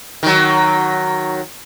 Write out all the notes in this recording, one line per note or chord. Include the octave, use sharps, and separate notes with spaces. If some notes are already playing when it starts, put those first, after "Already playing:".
D#3 F#3